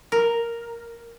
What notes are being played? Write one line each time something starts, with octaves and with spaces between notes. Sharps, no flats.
A#4